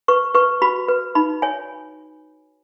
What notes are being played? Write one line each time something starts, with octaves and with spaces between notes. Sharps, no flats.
B4 C#6
B4 C#6
F#4 B5
B4
D#4 B5
C#5 G#5